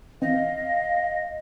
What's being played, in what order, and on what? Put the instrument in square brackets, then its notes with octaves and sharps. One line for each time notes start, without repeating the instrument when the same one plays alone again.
[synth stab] E3 C4 [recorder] D#5 [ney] F5